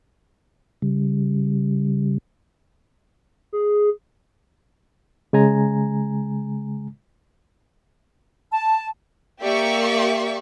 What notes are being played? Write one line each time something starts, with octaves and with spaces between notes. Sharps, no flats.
C#3 G3
G#4
C#3 G#3 G#5 A#5
A5
A#3 G4 D5 E5 C#6